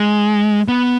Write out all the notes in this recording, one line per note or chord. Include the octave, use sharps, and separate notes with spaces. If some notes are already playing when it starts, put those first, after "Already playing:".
Already playing: G#3
B3